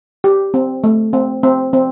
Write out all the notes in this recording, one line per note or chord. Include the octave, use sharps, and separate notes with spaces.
G4
C4
A3
C4
C4
C4